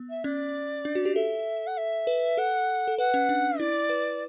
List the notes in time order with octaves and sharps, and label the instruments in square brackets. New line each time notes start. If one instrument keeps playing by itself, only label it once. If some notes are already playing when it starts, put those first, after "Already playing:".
Already playing: [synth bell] B3
[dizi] E5
[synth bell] C#4 [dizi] D5
[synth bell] D4
F#4
G4
[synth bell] A4 [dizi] E5
[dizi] F#5
E5
[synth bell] B4
[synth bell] A4 [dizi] F#5
[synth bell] A4
[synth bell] B4 [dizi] F#5
[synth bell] C#4
D4
[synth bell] E4 [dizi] D5
[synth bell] B4